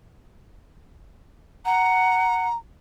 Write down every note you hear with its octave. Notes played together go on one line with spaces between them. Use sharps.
F#5 A#5